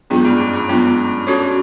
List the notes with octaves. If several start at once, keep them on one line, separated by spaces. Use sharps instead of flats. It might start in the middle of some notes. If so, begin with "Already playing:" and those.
G#2 F#3 B3 D4 F4
G2
F#2
G2
F#3 B3 D4 F4
C#4 F#4 A4 C#5